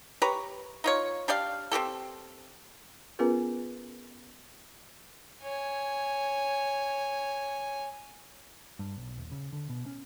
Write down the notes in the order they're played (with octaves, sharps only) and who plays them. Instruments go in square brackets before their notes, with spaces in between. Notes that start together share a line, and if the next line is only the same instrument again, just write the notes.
[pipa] G4 B4 C#5 A#5
D#4 F4 C#5
D4 G4 D5 F5
C4 F#4 G4 A4
[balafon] B3 C#4 F4 G#4 A#4 B4
[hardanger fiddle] C#5 G#5
[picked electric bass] G2
B1
D#1
C#3
D3
B2
C#4